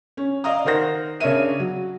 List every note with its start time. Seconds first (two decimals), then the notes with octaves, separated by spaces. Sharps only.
0.17 C#4
0.44 D5 D#5 F5 A#5 D#6
0.65 D#3 A#4 C5 F#5 A#6
1.20 C#3 D4 A#4 C#5 E5 D#7
1.60 F#3